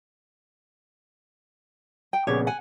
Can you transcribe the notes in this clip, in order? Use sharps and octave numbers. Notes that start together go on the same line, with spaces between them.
G5
A#1 C#3 B3 G4 C#5
F#5 G#5